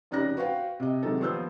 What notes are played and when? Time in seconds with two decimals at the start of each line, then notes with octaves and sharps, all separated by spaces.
0.11 F1 C#3 D#4 G4 F#6 A#6
0.37 F#4 B4 C5 F5 G5
0.80 C3 D#5
1.03 C3 D#3 F#3 G#3 D#4 A4
1.20 D#2 F3 B3 C5 E6 G6